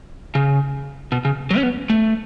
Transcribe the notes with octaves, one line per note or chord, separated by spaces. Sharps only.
C#3
B2
C#3
F#3
C#4
B3
A3